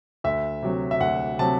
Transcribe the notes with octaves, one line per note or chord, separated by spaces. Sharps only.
D2 E5
C3 F#3
E5
D2 F#5
C3 F#3 A5